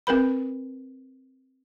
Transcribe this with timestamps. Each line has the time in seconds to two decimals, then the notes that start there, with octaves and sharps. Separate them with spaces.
0.07 C4 A#4 B4 B5